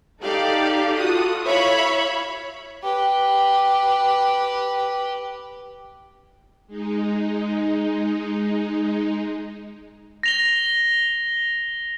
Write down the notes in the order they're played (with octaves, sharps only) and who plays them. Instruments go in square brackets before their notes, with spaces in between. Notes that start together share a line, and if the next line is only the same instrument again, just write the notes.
[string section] D#4 G4 A4 D5 F5
F4 F#4 A4 D#6
E4 C#5 E5 F5 B5
[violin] G4 B4
[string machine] G#3 D#4
[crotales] A#6 F7 G7